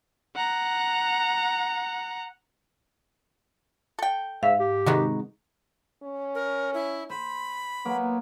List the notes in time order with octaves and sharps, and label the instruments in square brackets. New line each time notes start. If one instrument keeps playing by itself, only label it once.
[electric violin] F#5 A#5
[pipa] A4 G5
[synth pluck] G#2 [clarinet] E5 [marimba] F5
[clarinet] G4
[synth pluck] C3 D#3 G#3 [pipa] B3 D#4 F#4
[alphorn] C#4
[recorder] A#4
E4
[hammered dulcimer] C5 [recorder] B5
[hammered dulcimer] F#3 A#3 [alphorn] B3